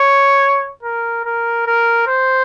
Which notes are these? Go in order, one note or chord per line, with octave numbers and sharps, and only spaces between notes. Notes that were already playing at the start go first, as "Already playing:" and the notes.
Already playing: C#5
A#4
A#4
A#4
C5